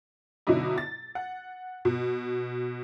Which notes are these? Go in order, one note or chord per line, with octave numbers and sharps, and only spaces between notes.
B2 D3 F#3 D#4 E4
A6
F#5
B2